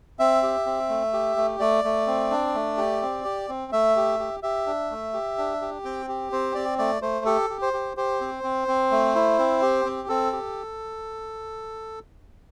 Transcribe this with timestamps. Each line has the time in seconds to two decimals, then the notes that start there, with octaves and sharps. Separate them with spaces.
0.19 C4 E5
0.43 G4
0.66 C4
0.89 A3
1.13 G4
1.36 A3
1.60 A3 D5
1.84 A3
2.07 C4
2.31 D4
2.55 A3
2.77 G4
3.02 C4
3.25 G4
3.49 C4
3.72 A3 E5
3.96 G4
4.20 G4
4.43 G4 E5
4.66 D4
4.90 A3
5.13 G4
5.38 D4
5.62 G4
5.84 C4 G5
6.09 G4
6.32 C4 C5
6.55 C4 D5
6.78 A3 D5
7.02 A3 C5
7.26 G4 A4
7.50 G4
7.62 C5
7.73 G4
7.97 G4 C5
8.21 C4
8.43 C4
8.68 C4
8.91 A3
9.15 E4
9.39 C4
9.62 G4
9.85 C4
10.08 C4 A4
10.32 G4